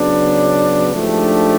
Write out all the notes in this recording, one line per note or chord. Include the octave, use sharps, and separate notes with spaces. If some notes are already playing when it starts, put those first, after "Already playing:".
Already playing: C#3 F#3 B3 D4
G#2 F3 A3 D4 G4